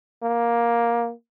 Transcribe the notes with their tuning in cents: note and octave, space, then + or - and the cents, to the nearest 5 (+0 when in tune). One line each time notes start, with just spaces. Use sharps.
A#3 +10